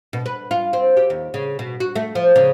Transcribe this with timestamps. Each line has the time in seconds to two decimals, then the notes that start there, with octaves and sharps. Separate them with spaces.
0.13 B2
0.26 B4
0.51 F4
0.73 C4
0.97 G4
1.10 D#2
1.34 C#3
1.59 B2
1.80 F#4
1.96 A3
2.15 F3
2.36 C#3